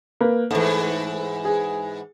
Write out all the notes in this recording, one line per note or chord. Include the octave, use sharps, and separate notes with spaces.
A#3 B4
G#2 E3 A3
G#4